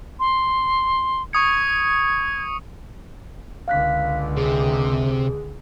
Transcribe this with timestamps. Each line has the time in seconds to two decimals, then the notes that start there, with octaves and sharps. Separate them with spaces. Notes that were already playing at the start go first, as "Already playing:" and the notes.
0.19 C6
1.33 C#6 D#6 G#6 C#7
3.68 C#2 D3 F5 F#6 B6
4.37 C3 G#4